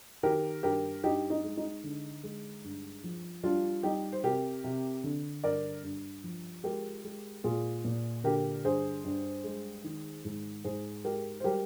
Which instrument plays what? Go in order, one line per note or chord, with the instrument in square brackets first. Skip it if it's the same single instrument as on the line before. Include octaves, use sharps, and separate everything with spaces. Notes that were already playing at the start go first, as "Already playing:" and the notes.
[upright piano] D#3 G4 A#4
G2 G4 A#4
G2 D#4 G4
D#4
G#3
D#4
D3
G#3
G2
F3
G3 D4 F4
G3 D#4 G4
C5
C3 G4 A#4
C3
D3
G2 A#4 D5
G2
F3
G#3 G4 A#4
G#3
A#2 F4 G#4
A#2
D3 G4 A#4
G2 G#4 C5
G2
G#3
D#3
G#2
G#2 G#4 C5
G#3 G4 A#4
C5
G3 G4 A#4